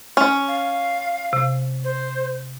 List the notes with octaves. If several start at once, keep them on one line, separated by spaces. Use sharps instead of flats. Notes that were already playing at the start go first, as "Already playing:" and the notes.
C#4
F5
C3
C5